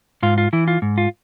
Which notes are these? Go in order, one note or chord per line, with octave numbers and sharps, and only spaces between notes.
G#2 F4
F4
E3 E4
F4
G#2
F4